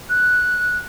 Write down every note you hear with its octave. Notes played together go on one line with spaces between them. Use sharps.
F#6